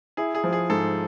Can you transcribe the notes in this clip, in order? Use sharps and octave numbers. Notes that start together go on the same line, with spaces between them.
E4 G#4
G#4
F3
G#4
G#2 A4